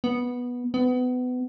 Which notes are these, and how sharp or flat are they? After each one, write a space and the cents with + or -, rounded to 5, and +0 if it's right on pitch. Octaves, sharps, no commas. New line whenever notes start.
B3 -10
B3 +25